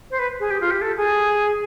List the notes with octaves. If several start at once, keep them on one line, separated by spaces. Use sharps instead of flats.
C5
B4
G#4
G4
F4
G4
A4
G#4